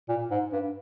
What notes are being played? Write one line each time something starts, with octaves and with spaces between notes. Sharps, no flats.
A#2
G#2
G2